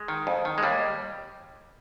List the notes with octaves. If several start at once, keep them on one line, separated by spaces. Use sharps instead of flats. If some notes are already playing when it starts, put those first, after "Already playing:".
Already playing: G#3
D#3
F2
D#3
G#3
D#2 G3